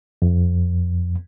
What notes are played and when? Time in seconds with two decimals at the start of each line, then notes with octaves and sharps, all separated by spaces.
0.22 F2